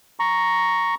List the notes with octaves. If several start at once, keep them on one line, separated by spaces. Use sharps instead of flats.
A#5 C#6